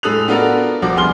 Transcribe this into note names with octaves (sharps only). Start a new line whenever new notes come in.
A2 G#3 A4 D#6 F#6 F7
B3 D4 F4 F#4 A4 A#4
A#1 F3 F#4 D6
C2 B3 G#4 C6 F6 G7